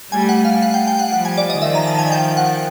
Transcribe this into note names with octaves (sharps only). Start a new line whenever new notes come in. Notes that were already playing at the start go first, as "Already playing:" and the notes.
G3 A3 G#5
F#5
F5
F#5
G5
G5
F#5
F3 G3 F#5
G#5
D5
D#5
D#3 F3 E5
A#5
A5
G#5
G5
F#5